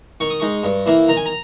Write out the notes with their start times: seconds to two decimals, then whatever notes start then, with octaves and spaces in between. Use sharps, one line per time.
0.20 D#3 C#6
0.30 D#6
0.40 G#3 D#4 C#6
0.64 G2
0.86 E3 A#3 E4
1.08 D#3 A#5
1.17 G#5
1.26 A#5